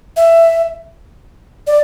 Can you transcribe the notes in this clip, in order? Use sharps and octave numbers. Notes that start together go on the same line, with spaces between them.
E5
D5